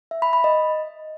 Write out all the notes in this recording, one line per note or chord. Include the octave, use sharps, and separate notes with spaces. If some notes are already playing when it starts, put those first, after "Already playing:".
E5
B5
B5
D#5